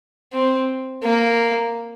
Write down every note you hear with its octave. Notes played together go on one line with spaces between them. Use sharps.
C4
A#3